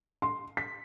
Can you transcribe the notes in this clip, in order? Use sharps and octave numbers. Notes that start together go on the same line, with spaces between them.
C6
B6